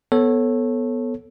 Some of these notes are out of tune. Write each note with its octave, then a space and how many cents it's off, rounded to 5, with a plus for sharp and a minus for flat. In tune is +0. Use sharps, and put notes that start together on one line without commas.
B3 +0 A4 +0 C#5 -20